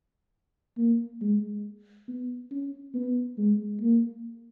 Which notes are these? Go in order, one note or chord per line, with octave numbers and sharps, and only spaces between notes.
A#3
G#3
B3
C#4
B3
G#3
A#3